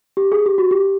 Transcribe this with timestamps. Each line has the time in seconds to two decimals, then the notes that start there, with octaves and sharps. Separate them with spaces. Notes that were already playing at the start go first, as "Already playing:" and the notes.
0.17 G4
0.32 G#4
0.46 G4
0.58 F#4
0.71 G4